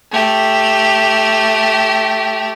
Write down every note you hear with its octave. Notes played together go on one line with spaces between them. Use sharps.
A3 G4